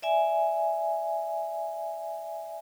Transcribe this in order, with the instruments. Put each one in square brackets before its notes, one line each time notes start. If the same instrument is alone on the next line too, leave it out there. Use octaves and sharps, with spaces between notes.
[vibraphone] D5 E5 G#5